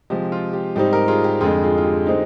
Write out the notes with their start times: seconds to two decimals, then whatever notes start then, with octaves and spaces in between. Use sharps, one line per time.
0.10 C3 F3 G#3 G4
0.32 F4
0.53 G4
0.76 G#2 G3 C4 D#4 G4
0.93 G4 A#4
1.08 F4 G#4
1.24 G4
1.41 F2 D3 G#3 F4 G#4
1.64 F4 G#4
1.78 F4
1.84 G4
2.06 D3 G#3 C4 D#4